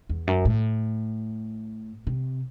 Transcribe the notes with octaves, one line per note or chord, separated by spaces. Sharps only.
E2
F#2
A2
C3